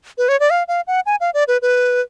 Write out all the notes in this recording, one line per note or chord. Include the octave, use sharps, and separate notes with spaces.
B4
C#5
D5
F5
F5
F#5
G#5
F5
D5
B4
B4